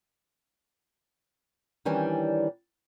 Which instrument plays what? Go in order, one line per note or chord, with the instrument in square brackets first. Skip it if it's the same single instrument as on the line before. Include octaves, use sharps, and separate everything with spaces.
[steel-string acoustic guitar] D#3 E3 G3 C#4 D4